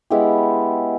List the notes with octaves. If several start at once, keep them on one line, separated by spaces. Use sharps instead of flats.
G#3 B3 E4 G4